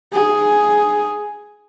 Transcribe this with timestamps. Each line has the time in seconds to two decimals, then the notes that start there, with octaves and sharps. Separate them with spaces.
0.13 G#4